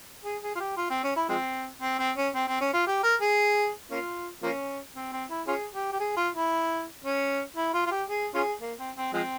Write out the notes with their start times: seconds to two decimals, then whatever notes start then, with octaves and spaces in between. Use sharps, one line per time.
0.25 G#4
0.43 G#4
0.55 F4
0.60 G4
0.77 F4
0.90 C4
1.03 C#4
1.16 E4
1.29 F3 G#3 C4
1.81 C4
1.99 C4
2.17 C#4
2.34 C4
2.48 C4
2.61 C#4
2.73 F4
2.87 G4
3.03 A#4
3.21 G#4
3.91 A#3 C#4 F4
4.42 F3 A#3 C#4
4.95 C4
5.12 C4
5.30 E4
5.47 C#4 F4 G#4
5.74 G4
5.92 G4
6.00 G#4
6.17 F4
6.34 E4
7.05 C#4
7.57 E4
7.74 F4
7.86 F4
7.91 G4
8.09 G#4
8.34 C#4 F4 G#4
8.61 A#3
8.78 C4
8.96 C4
9.13 F3 G#3 C4